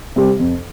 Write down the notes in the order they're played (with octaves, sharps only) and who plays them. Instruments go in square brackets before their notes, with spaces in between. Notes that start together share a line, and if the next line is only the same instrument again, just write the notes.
[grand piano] C3 G3 C4 G4
F2